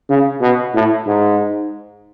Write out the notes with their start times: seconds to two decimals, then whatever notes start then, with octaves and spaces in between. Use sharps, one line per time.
0.10 C#3
0.41 B2
0.74 A2
1.07 G#2